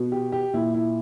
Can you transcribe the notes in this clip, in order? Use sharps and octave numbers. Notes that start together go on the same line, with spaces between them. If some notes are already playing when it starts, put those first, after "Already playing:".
Already playing: B2
G4
G4
A#2 E4
E4